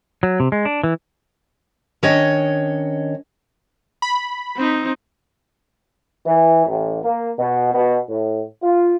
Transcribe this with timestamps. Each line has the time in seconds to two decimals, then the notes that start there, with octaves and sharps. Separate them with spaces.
0.23 F#3
0.40 C3
0.52 G#3
0.65 D4
0.84 E3
2.03 D#3 C#4 D4 C#5 D#5
4.02 B5
4.57 C4 D#4
6.26 E3
6.66 A1
7.04 A#3
7.39 B2
7.74 B2
8.09 A2
8.63 F4